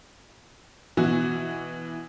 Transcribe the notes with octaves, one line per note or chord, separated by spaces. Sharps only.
B2 E3 F#4